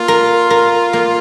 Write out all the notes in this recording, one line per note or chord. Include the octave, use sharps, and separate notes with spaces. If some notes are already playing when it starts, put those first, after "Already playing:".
Already playing: A#3 F4
A#4
A#4
A#3